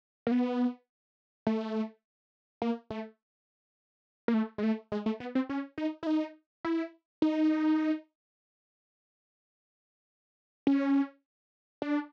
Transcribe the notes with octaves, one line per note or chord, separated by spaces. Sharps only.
A#3
B3
A3
A#3
A3
A#3
A3
G#3
A3
G#3
A3
B3
C4
C#4
D#4
E4
D#4
E4
D#4
C#4
D4